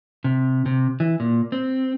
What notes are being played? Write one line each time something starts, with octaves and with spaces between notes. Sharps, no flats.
C3
C3
E3
A#2
C4